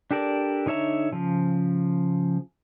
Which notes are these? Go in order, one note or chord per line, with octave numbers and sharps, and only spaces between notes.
D4 G4 A4 A#4 D5
D3 D#4 C#5 E5 A#5
C#3 F3